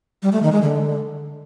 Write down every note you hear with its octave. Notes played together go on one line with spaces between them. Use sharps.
G3
A3
D#3
G#3
D3